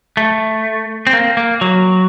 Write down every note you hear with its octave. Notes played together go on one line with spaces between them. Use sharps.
A3
C4
A#3
A#3
F#3